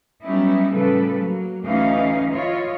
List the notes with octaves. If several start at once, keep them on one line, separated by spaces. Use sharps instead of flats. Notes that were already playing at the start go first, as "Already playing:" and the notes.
F#3 G3 B3 C#4 D#4 E4
A2 C#3 F3 G3 A4 B4
F#3 A#3
D2 E3 C#4 D#4 D#5 F5
E4 F4 C#5 D#5